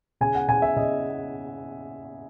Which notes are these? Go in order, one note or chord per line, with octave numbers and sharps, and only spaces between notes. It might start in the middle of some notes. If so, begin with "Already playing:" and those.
C#3 G#5
F#5
C#3 G#5
E5
C#3 D#5